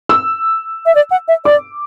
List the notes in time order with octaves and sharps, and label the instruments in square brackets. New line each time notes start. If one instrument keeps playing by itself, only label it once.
[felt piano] E6
[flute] E5
D5
F#5
E5
[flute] D5 [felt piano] D6